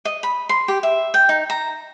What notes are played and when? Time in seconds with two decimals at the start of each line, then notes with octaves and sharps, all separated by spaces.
0.05 D#5
0.23 B5
0.49 C6
0.68 G4
0.83 E5
1.14 G5
1.29 D#4
1.50 A#5